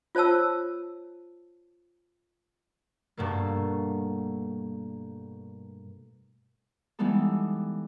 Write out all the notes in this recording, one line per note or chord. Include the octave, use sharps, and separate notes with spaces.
F4 C5 C#5 A5 E6
G2 B2 A3 A#3
E3 G3 G#3 B3 D#4 A4